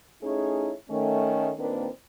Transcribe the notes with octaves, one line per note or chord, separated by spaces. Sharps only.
A3 C#4 D#4 E4 G#4 C#5
D#3 A3 C#4
A#2 D#3 A#3 C4 D4 B4